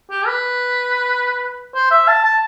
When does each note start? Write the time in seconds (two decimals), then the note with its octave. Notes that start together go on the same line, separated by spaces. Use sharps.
0.10 G4
0.27 B4
1.75 C5
1.91 E5
2.08 A5
2.24 A5